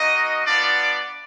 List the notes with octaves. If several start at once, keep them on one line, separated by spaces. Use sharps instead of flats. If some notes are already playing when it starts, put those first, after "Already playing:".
Already playing: A#3 D#4 F#4 D#5
B3 D4 F4 D5